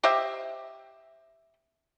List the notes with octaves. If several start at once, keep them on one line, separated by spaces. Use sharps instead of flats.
G4 C5 D#5 E5